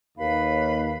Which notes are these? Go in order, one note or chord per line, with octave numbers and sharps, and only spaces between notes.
D#2 B4 F5 B5